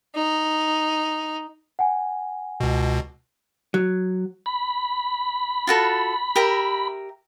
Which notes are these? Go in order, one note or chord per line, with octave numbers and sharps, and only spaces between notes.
D#4
F#5 G#5
C#2 B2
F#3
B5
F4 F#4 A4
G4 A#4 E5